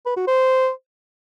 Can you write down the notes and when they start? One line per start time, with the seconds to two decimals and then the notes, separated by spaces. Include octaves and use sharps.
0.06 B4
0.17 F#4
0.28 C5